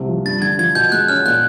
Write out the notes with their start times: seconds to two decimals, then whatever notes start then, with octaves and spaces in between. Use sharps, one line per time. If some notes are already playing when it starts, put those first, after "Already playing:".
Already playing: C2 C3 F#3
0.08 F3
0.25 G2 A6
0.42 D3 G#6
0.59 F3 G#6
0.75 B2 G6
0.92 G#3 F#6
1.08 C#4 F6
1.25 A#2 F#6